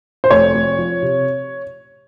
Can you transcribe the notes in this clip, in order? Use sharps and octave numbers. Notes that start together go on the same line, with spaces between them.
C5
F1 C#5
F1
F3
C3